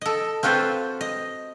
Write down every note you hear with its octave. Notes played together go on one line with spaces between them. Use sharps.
A4 D#5
C4 F4 F#4 A4 B4 C5
D#5